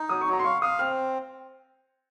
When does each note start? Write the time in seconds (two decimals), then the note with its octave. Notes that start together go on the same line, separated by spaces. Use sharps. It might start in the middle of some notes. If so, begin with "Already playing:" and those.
Already playing: D#4
0.09 F#3 D#6
0.21 C#6
0.27 F#3
0.33 A#5
0.39 C6
0.44 F5 C#6
0.62 F5 D#6
0.79 C4 F6